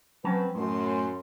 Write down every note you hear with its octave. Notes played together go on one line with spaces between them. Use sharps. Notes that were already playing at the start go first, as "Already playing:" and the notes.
F#3 C4 C#4 B4 A5
F#2 A2 C6